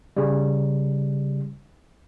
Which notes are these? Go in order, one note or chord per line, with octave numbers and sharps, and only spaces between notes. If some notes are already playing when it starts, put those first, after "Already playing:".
C#3 G3